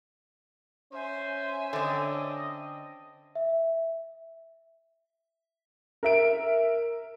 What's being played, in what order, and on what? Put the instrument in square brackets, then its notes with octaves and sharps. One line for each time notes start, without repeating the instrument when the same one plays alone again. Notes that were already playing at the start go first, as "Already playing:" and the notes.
[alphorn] C#4 [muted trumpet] C5 [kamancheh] E5 G#5
[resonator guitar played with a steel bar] D3 C4 [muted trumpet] D#5
[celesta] E5
[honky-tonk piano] A#4 E5 D7